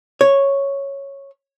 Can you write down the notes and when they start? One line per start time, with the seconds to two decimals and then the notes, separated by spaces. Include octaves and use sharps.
0.21 C#5